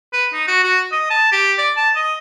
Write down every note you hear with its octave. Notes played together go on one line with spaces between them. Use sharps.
B4
D#4
F#4
F#4
D#5
A5
G4
D5
A5
D#5